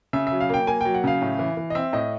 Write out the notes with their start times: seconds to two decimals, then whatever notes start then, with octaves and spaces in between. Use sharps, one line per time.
0.13 C#3 E5
0.27 F#3 E5
0.40 F5
0.49 A#3 G5
0.67 A#3 G#5
0.81 F#3 G5
0.94 F#5
1.04 C#3 F5
1.22 A2
1.39 E3
1.57 E3
1.70 D#5
1.75 C4 E5
1.93 A2 D#5